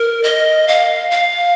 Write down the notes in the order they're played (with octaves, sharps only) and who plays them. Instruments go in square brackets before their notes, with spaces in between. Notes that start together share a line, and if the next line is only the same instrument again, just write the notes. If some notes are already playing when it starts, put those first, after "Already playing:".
Already playing: [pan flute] A#4
D#5
F5
F5